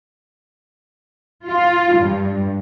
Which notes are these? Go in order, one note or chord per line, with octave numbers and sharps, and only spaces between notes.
F4
G2